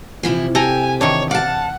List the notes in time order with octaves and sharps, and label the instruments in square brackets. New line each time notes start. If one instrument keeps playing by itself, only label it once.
[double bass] C3 [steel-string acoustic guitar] E3 F3 E4
[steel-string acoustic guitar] G4 [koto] A4 A#5 [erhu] G#5
[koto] D#3 E3 D4 [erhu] C#5
[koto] D5 [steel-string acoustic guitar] F5 A5 [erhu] F#5